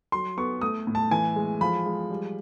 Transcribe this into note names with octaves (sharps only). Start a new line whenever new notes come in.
F#3 C6
B3 C#6
A3 D#6
A2
A5
E3 G#5
G#3
F3 B5
G#3
G3